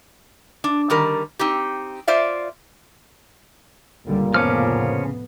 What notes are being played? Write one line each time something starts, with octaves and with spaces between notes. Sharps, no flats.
D4
D3 D#3 G3 A#4
C4 D#4 G4
F4 C5 D5 E5 F5
C#2 A#2 D3 G3
F1 A2 C#3 F3 B3 C#4 D6 F6